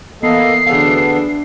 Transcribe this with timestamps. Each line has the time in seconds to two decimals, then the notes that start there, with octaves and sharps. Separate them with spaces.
0.23 E3 A#3 B3 A4 D#5 C7
0.67 D2 E3 B3 D4 G#4 A4 C#5 F5